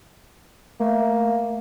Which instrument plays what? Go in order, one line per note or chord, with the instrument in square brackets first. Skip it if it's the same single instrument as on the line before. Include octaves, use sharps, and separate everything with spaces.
[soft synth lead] A3 [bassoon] A#3